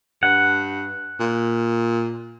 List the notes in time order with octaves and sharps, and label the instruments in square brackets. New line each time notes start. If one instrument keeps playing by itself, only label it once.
[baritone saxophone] G2 [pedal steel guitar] F#5
[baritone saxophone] A#2